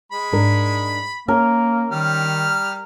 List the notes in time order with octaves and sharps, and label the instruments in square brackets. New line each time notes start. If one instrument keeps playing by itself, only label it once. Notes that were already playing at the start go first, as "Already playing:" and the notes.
[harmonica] G#3 B5
[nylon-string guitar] G#2 D4 A#4
[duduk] A#3 [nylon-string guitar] C#4 [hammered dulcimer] A#4
[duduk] D#3 [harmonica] G3 F6